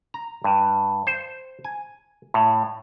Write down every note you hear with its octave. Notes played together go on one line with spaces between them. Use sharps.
A#5
G2
C5
G#5
A2